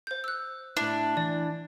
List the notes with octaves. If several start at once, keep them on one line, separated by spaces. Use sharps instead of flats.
C5 G6
E6 F#6
A2 D4 E4
E3 D5